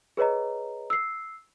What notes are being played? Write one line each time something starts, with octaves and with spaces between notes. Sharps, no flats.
G#4 B4 C#5 D#5 A#5
E6 C7